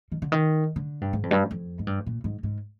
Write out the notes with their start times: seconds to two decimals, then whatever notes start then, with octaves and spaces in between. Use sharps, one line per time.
0.12 D#3
0.22 D3
0.32 D#3
0.76 D3
1.01 G2
1.13 G#2
1.23 F2
1.31 G2
1.51 F2
1.79 G#2
1.87 G2
2.06 A#2
2.24 G#2
2.43 G#2